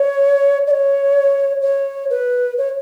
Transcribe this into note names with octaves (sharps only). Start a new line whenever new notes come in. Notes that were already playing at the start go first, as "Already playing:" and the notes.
Already playing: C#5
D5
C#5
C#5
B4
C#5